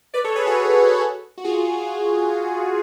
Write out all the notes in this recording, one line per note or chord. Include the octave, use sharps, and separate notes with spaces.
B4 D5
A4 C#5
G#4 B4
F#4 A4
F#4
F4 G#4